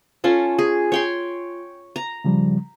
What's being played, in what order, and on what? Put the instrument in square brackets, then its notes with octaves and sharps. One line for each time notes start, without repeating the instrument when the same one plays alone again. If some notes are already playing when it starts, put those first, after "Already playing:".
[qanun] C#4 F4 A4
G#4
C#5 G5 C6
A#5
[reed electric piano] C#3 F3 G3